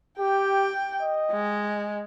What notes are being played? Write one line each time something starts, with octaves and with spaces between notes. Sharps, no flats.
G4 G5
D#5
G#3